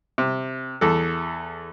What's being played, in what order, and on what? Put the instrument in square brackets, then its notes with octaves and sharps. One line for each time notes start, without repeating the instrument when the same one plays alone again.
[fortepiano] C3
E2 A4